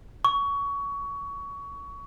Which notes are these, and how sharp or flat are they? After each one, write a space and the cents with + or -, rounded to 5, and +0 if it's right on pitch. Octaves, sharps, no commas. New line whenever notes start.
C#6 +20